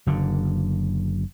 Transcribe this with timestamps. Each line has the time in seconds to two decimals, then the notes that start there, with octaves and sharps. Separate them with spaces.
0.07 F#1 D3